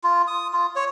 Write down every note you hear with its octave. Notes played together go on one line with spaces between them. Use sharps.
F4
D#6
F4
C#5